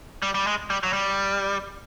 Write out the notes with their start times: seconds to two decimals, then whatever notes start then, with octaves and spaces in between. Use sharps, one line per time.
0.22 G3
0.34 G3
0.47 G#3
0.70 G3
0.83 F#3
0.93 G3